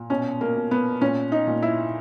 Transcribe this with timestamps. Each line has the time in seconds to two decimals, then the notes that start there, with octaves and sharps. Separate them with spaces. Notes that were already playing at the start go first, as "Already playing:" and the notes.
Already playing: A#2
0.10 B2 C#4
0.41 A#3
0.56 B2
0.71 B3
1.01 A#2 C#4
1.32 D#4
1.47 A#2
1.62 E4